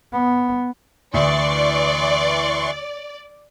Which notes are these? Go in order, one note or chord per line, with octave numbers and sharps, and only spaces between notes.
B3
D2 E3 D5 C6 C#6